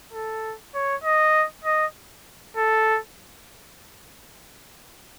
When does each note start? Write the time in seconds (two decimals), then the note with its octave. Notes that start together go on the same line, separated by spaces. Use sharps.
0.13 A4
0.74 C#5
1.04 D#5
1.64 D#5
2.57 A4